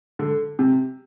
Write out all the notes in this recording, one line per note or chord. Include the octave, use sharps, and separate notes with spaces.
D3
C3